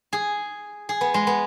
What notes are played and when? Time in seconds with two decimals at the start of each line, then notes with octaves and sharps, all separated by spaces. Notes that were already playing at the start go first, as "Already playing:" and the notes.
0.13 G#4
0.89 G#4
1.01 B3
1.14 G#3
1.27 B3